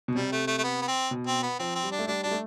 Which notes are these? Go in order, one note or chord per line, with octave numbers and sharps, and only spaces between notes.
B2
C3 G3
A3
A3
A3
B3
B3
C4
B2
C4
B3
F3 C4
C4
G3
D4
A3
G3 D4
G3 D4
A3